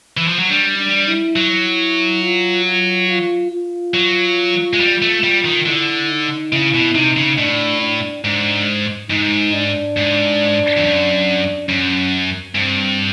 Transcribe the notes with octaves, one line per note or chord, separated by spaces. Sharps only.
E3
F3
F#3
G3 D4
D4
E4
F#3 E4
F4
F4
F4
F4
F#3
G#3
G3
A3
G3
D#3
D3 E4
D#4
C#3 E4
B2
C3 D#4
C#3
A2 D4
D4
G#2 D4
G#2 D#4
D4
G#2
F2
F#2
F#2 C#4
G2 C4